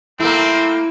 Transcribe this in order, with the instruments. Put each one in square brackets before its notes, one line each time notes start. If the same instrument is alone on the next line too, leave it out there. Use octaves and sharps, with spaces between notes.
[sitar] A3 A#3 [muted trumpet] C4 [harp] E4